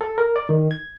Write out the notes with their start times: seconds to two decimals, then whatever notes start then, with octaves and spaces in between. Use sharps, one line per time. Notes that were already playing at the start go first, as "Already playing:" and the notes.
0.01 A4
0.18 A#4
0.36 D5
0.49 D#3
0.71 G#6